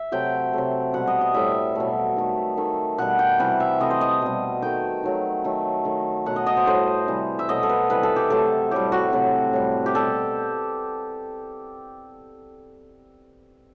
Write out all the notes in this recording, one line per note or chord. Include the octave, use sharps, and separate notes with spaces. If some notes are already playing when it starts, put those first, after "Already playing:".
Already playing: E5
C3 F#3 A3 G5
C3 F#3 A3
B2 G3 F#5
D#5
D#5
A2 G3 E5
B2 F#3 A3
D#3 A3
D#3 A3
B2 G3 F#5
G5
C3 E3 G3 F#5
E5
C3 E3 A3 D#5
C5
D#5
B2 G3
D#3 A3 G5
D#3 F#3 A3
D#3 F#3 A3
D#3 A3
B2 F#3 A3 F#5
D#5
D#5
C5
A2 G3 C5
C3 E3 G3
E5
B2 F#3 A3 D#5
A4
B4
C3 E3 G3 B4
A4
G4
C3 F#3 A3 A4
A2 G3 G4
F#4
C3 F#3 A3
A2 G3
G4
B2 G3 A4